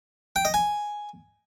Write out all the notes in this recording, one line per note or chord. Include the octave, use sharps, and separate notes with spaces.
G5
D#5
G#5